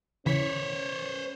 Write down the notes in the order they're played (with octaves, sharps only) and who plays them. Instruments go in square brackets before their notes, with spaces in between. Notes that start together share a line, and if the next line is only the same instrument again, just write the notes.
[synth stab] C#3 E3 B6 [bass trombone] C#4 [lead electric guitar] C5 C#5